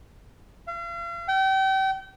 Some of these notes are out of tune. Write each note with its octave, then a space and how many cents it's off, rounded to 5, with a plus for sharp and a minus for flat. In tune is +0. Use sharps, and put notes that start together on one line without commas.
F5 -40
G5 -35